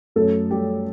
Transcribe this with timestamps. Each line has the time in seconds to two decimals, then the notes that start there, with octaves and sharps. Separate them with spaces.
0.16 F#2 F#3 A3 A4
0.51 G3 G4